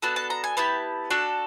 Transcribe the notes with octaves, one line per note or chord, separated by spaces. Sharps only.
B3 D4 F#4 A4 A5
A5
A#5
G#5
B3 E4 G4 A5
D4 F#4 A4